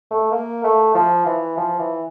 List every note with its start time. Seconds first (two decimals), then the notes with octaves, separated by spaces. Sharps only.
0.11 A3
0.32 A#3
0.64 A3
0.94 F3
1.26 E3
1.57 F3
1.79 E3